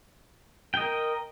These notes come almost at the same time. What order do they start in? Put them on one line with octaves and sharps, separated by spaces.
G5 D#5 A#4